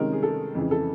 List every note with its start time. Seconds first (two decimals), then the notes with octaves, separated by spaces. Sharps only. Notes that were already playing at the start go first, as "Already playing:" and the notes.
Already playing: C3 D#3 G#3 C#4 A#4
0.12 G#4
0.23 A4
0.55 F2 C#3 E3
0.71 A4